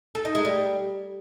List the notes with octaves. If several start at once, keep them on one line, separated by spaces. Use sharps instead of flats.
A4
D#4
G#3
G3